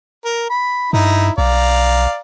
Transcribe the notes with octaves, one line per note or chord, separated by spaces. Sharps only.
A#4
B5
G2 D#4 E4 A#5
B1 D5 F5 A#5